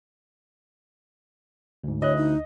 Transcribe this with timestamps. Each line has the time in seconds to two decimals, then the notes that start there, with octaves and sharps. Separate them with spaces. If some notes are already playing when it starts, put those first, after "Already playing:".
1.84 D2 G#2
2.02 D2 E4 C#5 D#5 F#6
2.16 D#4